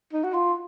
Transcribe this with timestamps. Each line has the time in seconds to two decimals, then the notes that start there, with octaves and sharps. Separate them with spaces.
0.13 D#4
0.24 F#4
0.34 F4